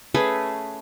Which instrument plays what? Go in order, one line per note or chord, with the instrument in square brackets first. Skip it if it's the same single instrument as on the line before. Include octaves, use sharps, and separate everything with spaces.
[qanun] A3 C#4 G#4 B4